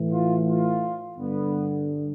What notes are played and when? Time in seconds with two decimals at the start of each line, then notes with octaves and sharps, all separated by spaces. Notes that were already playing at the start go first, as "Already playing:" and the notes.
Already playing: A2 E3
0.11 F4
0.46 F4
1.17 G2 D3 B3